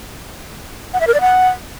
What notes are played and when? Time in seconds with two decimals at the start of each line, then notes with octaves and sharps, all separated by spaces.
0.94 F#5
1.01 E5
1.07 A#4
1.14 D5
1.21 F#5